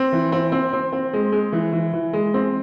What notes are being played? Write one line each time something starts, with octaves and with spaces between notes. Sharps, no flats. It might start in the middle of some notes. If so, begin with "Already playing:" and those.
Already playing: C4
E3
C4
C4
C4
C4
G#3
G#3
E3
E3
E3
G#3
C4